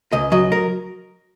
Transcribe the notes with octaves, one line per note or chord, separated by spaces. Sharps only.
C#2 D#5
F#3 D#5
A#4